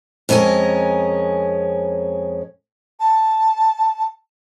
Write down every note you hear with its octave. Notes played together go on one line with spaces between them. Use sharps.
F2 G#3 C#4 E4 A#4
A5